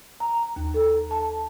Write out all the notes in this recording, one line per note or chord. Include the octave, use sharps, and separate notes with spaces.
A#5
D#2
A4
A5